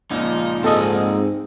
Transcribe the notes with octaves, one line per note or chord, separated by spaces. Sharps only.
C#2 A#2 F3 D#4
G#2 C4 A4 D#5 G#5